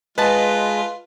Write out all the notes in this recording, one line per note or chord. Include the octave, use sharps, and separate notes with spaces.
G#3 F4 B4 D#5 A5